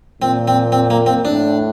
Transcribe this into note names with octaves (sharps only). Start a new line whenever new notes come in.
A#2 C4
C4
C4
A#3
C4
A2 D4